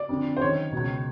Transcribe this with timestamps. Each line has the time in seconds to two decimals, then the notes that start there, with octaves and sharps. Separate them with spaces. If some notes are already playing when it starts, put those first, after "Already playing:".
Already playing: D5
0.09 F2 D3
0.37 C5
0.41 F#2 D#3 C#5
0.72 C#2 B2